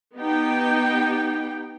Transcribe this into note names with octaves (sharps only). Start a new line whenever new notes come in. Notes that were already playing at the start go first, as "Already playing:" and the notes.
B3 D#4 G4 G5